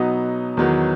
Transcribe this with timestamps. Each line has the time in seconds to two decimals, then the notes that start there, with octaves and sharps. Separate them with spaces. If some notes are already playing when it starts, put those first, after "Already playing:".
Already playing: B2 F#3 B3 D#4
0.57 E2 D#3 F#3 B3